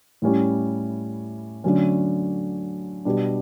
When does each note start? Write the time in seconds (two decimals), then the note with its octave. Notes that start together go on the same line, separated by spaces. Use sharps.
0.22 A2 G3 C#4 E4
1.64 D3 F#3 A3 C#4
3.05 B2 G3 D4